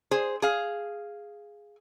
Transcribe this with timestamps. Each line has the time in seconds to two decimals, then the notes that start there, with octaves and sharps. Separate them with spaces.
0.11 G#4 C5
0.42 G#4 F5